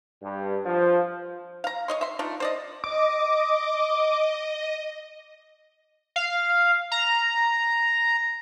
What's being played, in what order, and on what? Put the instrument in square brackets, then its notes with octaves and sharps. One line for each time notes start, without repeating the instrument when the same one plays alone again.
[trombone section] G2
F3
[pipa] F5 A#5
C#5 D#5 C6
E5 C6
A3 D4 D#4 F4
C5 D5 D#5
[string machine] D#5 [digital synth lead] D6
[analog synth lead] F5
A#5